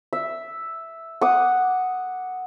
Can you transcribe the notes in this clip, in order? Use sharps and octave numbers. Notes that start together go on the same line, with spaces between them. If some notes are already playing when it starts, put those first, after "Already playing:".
E5
F#5 D6 D#6